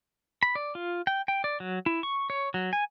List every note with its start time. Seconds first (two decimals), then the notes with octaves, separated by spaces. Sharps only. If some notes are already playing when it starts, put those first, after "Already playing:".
0.43 B5
0.55 D5
0.75 F4
1.07 G5
1.28 G5
1.44 D5
1.60 F#3
1.86 E4
2.03 C#6
2.30 C#5
2.54 F#3
2.73 G#5